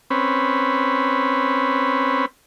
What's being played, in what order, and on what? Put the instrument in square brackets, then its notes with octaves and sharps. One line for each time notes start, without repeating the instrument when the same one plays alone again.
[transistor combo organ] C4 C#4 B4